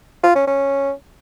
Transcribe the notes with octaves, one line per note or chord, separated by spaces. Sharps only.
F4
C#4
C#4